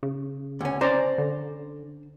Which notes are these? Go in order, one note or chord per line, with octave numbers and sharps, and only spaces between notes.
C#3
D2 C#4
C#4 C5 D5 A#5
D3